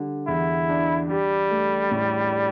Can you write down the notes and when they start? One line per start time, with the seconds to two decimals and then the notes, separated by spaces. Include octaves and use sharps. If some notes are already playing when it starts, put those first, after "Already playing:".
Already playing: D3 G3
0.27 E2 E4
0.69 D4
1.10 G3 G4
1.50 A3
1.91 A2
2.32 D5